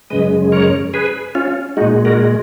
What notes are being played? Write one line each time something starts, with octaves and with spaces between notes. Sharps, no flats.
F#2 C#3 G#3 B4 D#5
A#4 C#5
G#4 B4
C#4 F4
A#2 G#3 D#4 F#4
F#4 A#4